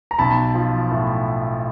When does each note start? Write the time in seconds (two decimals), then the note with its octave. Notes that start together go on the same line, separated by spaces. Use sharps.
0.11 A#5
0.19 B1 A5 B5
0.55 F3
0.91 A2